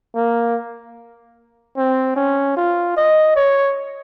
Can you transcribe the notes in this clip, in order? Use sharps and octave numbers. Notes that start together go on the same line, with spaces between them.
A#3
C4
C#4
F4
D#5
C#5